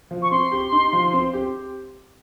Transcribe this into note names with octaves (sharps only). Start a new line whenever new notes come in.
F3
C#6
C4 C6
G4
D#4
F3
C4
G4